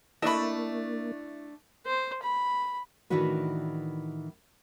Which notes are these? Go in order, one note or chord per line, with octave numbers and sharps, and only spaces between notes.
A3 A#3 D4 E4 D#5 A5 B5
C5
B5
A2 D#3 E3 D4 F#4 B4